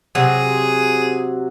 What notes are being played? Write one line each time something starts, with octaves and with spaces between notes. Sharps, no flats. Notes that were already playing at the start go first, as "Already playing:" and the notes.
C3 F#3 G#4